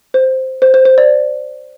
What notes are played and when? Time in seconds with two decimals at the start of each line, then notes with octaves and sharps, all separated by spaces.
0.14 C5
0.62 C5
0.74 C5
0.85 C5
0.98 D5